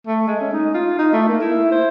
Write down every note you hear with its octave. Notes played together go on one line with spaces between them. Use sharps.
A3
G#3
C#4
D#4
F4
D#4
A3
A#3
E4
C5